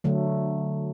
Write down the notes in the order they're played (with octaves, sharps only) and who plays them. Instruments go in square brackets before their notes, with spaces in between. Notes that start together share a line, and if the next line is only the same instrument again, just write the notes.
[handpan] D3 F#3 A3